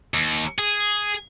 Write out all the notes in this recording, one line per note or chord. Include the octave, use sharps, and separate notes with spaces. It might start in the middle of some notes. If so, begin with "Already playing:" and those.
D#2
G#4